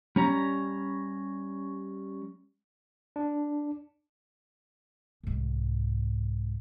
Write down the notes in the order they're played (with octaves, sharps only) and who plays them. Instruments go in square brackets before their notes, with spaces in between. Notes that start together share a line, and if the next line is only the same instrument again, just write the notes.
[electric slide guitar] G3 C#4 A#5
[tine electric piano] D4
[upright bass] C2 G#2